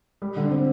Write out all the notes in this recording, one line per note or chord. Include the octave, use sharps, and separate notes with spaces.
G3
D3
C4